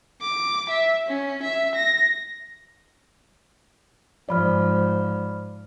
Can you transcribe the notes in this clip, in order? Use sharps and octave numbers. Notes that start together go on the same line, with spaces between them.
D6
E5
C#4
E5
A#6
G#2 F3 D5 B5 F6